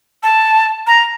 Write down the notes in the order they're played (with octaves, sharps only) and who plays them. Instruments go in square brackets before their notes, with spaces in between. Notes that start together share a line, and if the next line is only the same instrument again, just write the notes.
[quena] A5
A#5